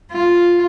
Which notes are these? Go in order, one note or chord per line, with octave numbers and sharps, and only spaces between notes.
F4